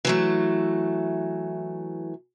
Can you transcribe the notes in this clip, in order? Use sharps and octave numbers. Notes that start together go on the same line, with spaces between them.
E3 F#3 A3